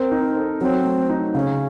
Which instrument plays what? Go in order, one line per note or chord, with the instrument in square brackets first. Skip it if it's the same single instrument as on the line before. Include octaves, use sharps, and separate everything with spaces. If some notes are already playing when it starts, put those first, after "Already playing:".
Already playing: [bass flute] C4 [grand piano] A#4 C5
[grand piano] D#4
A4
[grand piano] F#3 [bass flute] C4
[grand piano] A3
D#4
[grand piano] C#3 [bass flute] C#4